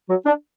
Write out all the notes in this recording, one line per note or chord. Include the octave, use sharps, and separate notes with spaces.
F#3 F#4
D4